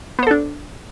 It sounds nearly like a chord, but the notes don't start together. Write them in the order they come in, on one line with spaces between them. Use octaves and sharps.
B3 C5 A4 D4